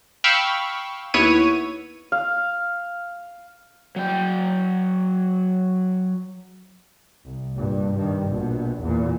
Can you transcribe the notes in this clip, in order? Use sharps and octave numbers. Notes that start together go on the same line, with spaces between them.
F5 G5 B5 C#6 E6
D#2 B3 E4 C#5 D#7
F5
F#3 G5
C2
G2 A#2
G2 D#3
A#1 B2
E2 A#2